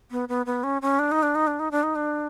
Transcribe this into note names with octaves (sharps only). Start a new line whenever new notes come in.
B3
B3
B3
C#4
C#4
D4
D#4
D4
D#4
D4
D#4
D4
D#4
D4